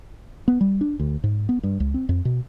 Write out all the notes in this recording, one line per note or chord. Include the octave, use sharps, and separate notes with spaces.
B3
G3
D4
D2
G#2
B3
G2
C#2
C4
F2
B2